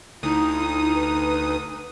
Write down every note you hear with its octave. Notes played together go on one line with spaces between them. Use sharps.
D2 D#4 E4 D#6
B4